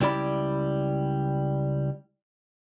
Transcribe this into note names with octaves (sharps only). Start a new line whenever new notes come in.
C#2 G3 E4 D5 B5